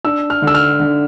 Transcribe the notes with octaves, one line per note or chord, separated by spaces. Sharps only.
D4 E6
F6
D3
E6
F6
D3